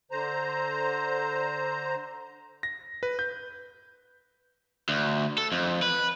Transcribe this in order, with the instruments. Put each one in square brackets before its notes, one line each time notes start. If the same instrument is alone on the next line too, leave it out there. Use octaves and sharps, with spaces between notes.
[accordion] D3 C5 A#5
[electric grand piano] A#6
B4
G6
[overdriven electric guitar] D2
A4
F2
B4